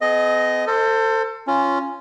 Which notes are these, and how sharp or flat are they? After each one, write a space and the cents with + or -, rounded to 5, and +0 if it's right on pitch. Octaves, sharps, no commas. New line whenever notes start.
C4 -45 G#4 +40 D#5 +0
A4 +30 C5 +0
C#4 +0 F4 -10